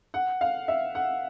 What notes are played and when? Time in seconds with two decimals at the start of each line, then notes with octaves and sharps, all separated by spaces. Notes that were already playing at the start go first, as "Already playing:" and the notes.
0.14 F#5
0.41 F5
0.68 E5
0.95 F#5